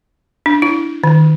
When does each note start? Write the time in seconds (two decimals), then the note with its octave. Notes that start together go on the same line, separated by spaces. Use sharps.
0.46 D4
0.62 E4
1.04 D#3